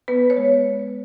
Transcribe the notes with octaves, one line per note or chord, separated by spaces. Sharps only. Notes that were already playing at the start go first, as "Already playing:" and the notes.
B3 B4
C#5
G#3